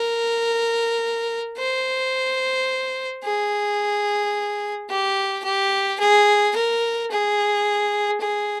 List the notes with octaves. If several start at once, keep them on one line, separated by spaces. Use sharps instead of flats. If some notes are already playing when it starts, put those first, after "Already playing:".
Already playing: A#4
C5
G#4
G4
G4
G#4
A#4
G#4
G#4